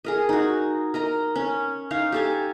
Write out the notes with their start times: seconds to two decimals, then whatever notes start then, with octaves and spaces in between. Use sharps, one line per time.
0.04 G#4 A#4 D#5
0.29 D#4 F#4
0.94 A#4 D#5 A#5
1.36 C#4
1.91 D#4 C#5 F5
2.12 G4 A4 G#5